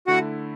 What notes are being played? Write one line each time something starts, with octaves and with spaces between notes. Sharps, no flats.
D3 A3 E4 F#4 F#5